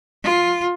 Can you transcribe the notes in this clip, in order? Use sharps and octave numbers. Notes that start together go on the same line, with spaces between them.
F4